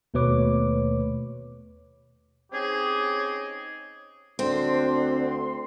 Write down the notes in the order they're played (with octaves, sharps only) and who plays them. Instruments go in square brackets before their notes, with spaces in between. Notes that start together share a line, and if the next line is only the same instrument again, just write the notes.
[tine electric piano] D#2 B2 A3 B4 C#5 D6
[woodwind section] C4 C#4 D#4 G4 G#4
[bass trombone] D2 [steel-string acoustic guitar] C4 [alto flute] D4 [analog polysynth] C6